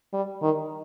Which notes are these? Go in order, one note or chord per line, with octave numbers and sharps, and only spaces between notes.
G3
D#3